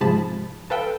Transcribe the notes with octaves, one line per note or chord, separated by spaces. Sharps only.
G#2 C3 F3 G#4 A5 B5
A4 B4 F5 G5 E6